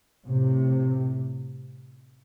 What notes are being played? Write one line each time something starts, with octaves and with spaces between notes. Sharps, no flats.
A2 C3